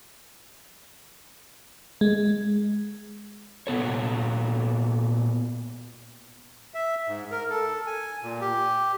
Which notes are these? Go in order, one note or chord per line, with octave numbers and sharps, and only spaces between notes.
G#3
A#2 B3 A4 C#5
E5
G#2
A#4
A4
G#5
A#2
G4